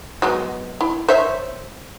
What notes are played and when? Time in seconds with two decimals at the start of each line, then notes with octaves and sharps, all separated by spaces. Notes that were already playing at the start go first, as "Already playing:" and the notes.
0.22 F#3 G#3 B3
0.81 E4
1.08 C5 C#5 E5